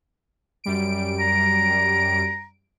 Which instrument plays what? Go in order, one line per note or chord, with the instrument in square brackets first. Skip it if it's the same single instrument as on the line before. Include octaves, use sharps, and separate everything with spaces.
[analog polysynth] F#2 G3 D7
[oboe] A#5